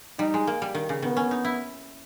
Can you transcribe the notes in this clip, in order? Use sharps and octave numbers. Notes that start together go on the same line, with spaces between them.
G3 D#4
G#3
A#3
G3
D#3
C#3
D#3 B3
C#4
D#4
E4